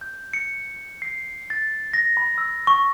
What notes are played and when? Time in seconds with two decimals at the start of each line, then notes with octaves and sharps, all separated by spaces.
0.01 G6
0.33 C#7
1.02 C7
1.50 A6
1.94 A#6
2.17 B5
2.38 E6
2.67 C#6